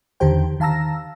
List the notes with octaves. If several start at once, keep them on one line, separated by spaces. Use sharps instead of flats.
E2 D3 D#3 G4 C5 G5
D#3 F5 A5 A#5 E6 A#6